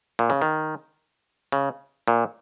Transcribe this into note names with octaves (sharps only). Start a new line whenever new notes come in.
A#2
C#3
D#3
C#3
A#2